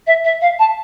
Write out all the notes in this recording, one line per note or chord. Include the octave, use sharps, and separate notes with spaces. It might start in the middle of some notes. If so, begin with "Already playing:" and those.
E5
E5
F5
A5